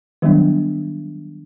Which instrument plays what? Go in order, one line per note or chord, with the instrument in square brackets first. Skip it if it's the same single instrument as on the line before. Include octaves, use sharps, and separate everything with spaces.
[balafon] D#3 F#3 G3 B3 D4